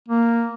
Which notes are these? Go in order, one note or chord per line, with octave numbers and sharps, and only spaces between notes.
A#3